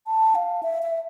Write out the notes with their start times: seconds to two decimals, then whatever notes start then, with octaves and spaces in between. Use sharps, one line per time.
0.07 A5
0.35 F5
0.63 E5
0.82 E5